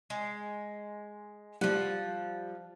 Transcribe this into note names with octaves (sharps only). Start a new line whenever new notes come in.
G#3
F3 G3 F#5